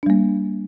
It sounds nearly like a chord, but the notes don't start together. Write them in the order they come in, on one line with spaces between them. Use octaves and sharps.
D4 G3 A#3